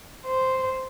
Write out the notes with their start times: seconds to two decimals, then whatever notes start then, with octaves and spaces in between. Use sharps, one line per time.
0.25 C5